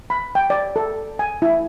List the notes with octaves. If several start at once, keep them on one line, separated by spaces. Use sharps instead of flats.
B5
G5
D5
A4
G#5
E4